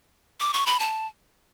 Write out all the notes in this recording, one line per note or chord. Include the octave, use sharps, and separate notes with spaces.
D6
C#6
B5
A5